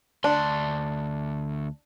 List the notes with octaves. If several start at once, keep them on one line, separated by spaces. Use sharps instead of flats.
D2 D4 C6